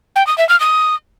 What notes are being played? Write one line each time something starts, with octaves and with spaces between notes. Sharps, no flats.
G5
D#6
E5
F6
D#6